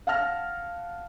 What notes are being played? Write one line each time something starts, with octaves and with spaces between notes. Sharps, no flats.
F5 F#5 A5 F6 A#6